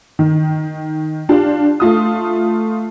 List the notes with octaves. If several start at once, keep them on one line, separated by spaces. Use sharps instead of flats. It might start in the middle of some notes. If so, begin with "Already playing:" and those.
D#3
D4 F4 G4
A3 F4 D#6